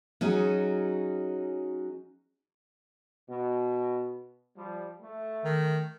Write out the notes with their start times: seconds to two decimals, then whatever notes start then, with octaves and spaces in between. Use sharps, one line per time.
0.21 F#3 C#4 D#4 F#4 G#4
3.28 B2
4.55 F3 G3
5.01 A3
5.45 D#3